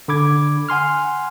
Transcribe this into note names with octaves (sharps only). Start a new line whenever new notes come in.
D3 B5 D6 G#6
F#5 G#5 C6 F6